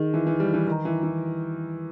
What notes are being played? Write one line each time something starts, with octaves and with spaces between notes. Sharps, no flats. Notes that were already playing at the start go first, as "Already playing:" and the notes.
Already playing: D#3 D#4 G#4 D#5
E3
E3
G3
E3
D#3 B4 D#5 A#5
E3
E3